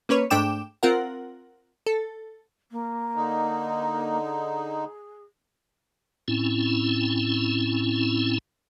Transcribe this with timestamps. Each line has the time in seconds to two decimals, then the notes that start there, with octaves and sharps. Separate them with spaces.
0.09 A#3 C#4 B4 C#5
0.30 G#2 A3 D4 G5 D6 E7
0.83 C4 F4 A#4 F#5
1.86 A4
2.71 A#3
3.16 D3 D#4
4.24 G#4
6.28 A2 C4 C#4 E4